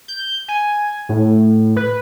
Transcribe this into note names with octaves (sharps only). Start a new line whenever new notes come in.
G6
G#5
A2
B4